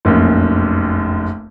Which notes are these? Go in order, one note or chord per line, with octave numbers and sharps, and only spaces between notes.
F1 A#1 F#2